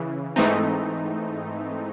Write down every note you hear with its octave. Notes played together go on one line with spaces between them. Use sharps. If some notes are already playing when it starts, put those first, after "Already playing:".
Already playing: C#3 E3
G#2 E3 A3 C4 D#4